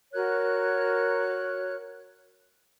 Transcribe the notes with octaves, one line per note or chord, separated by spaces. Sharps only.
F#4 A#4 C#5 F#6